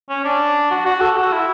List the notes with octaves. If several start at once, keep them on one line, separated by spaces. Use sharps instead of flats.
C#4
D4
F#4
F#4
A4
F#4
E4